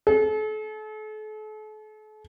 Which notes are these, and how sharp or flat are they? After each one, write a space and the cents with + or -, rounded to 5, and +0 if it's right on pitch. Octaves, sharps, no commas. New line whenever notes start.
A4 -40